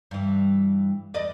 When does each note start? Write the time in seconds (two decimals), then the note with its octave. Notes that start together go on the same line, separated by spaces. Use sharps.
0.11 G2 E3
1.14 E2 D5 D#5